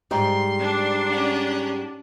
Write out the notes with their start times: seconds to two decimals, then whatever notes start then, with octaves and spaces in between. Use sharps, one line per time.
0.11 G#2 G3 C6
0.61 D4
1.11 C#4 F#5